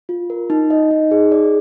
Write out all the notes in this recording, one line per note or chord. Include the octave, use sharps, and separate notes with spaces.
F4
A#4
D#4
D#5
D#4
G#4
D5